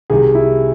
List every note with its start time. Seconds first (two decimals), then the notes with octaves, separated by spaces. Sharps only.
0.10 C2 C3 D#3 G#4
0.35 E4